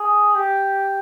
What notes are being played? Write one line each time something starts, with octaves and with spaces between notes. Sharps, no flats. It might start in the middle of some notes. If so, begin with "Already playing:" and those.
Already playing: G#4
G4